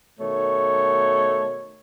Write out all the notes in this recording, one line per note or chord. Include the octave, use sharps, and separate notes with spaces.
B2 D#3 A3 C#5